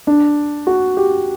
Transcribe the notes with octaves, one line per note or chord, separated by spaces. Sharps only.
D4
F#4
G4